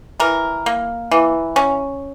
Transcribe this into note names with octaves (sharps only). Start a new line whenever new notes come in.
E3 A#4
A#3
E3
C#4